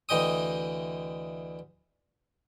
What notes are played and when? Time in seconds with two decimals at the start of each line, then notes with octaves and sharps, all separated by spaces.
0.09 D2 E3 D#5 G5 D#6